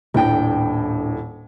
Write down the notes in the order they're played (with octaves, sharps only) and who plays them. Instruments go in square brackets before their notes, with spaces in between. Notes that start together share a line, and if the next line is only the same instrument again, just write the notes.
[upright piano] D#1 A2 [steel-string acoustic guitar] D4 G5